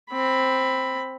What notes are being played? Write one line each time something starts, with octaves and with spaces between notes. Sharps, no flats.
C4 B5